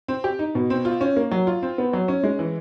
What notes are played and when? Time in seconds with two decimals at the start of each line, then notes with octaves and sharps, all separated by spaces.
0.08 C4
0.24 G4
0.39 D#4
0.55 B2
0.70 C4
0.85 F4
1.01 C#4
1.17 A#3
1.31 F#3
1.47 F4
1.63 C4
1.78 B3
1.93 F#3
2.08 C#4
2.23 G#3
2.39 E3